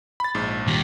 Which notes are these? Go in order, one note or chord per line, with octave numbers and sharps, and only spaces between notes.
B5 A6
A#1 G#2
D#2 G3